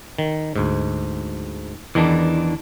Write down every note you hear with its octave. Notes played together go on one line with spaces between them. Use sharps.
D#3
D2 G#2
E2 D#3 E3 D4